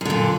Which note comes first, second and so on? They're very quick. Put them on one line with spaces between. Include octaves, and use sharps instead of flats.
F#2 D3 A#2